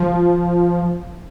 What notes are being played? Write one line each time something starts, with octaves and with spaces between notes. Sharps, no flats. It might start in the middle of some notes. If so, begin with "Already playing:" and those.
Already playing: F3